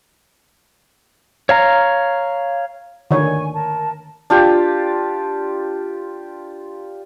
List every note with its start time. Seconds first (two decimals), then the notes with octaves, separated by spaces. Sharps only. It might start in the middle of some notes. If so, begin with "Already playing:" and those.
1.49 C#5 F5 A#5
3.11 D3 D#3 C#5 G#5 C#6
3.53 A#4 A5
4.30 D4 F4 G4